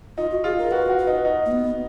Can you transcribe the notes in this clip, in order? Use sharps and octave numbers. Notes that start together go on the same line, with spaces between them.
D#4 F4
F#4
F4 G#4
A#4
F#4 B4
F#4
B4
D#4
D#4
A#3
B3